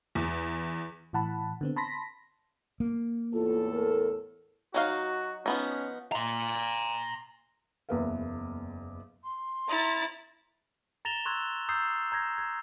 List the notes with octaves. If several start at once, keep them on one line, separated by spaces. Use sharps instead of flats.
E2
A2 E3 F#5 A5 B5
D3 B3 C4
A5 B5 C6 A#6 B6
A#3
E2 A2 F4 A4
A#4
F#3 D#4 F#4 F5
F3 B3 C#4 D#4
A#5 C6
F#1 E2 A#3 B4 E5 F5
C6
E4 A#5 A6
A#5 A6 A#6 E7 F7 G7
C6 C#6 E6 F#6 G#6
A#5 D#6 E6 G6 A6 C7
A#5 G6 G#6 A#6
G#6